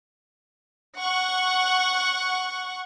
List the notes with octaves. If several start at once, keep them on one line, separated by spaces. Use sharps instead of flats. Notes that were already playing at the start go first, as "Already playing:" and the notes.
F#5 C#6